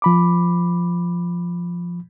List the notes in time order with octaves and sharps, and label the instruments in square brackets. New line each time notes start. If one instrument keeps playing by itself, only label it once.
[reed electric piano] F3 B5 D6